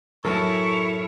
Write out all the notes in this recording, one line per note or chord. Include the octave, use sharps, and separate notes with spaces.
F#2 A2 E4 A4 A#4 C#5 A5 C#6